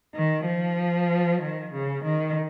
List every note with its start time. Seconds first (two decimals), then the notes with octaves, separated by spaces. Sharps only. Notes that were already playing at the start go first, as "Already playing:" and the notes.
0.13 D#3
0.44 F3
1.40 D#3
1.72 C#3
2.03 D#3